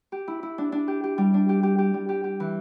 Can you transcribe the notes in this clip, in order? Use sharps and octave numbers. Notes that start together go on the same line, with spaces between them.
G4
E4
E4
D4
D4
G4
G4
G3
D4
G4
G4
G4
G3
G4
G4
E3